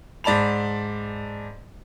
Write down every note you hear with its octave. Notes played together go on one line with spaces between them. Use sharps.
G#2 D5 A5 B5 F7